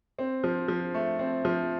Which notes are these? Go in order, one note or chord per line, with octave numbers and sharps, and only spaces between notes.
C4
F3
F3
A3
C4
F3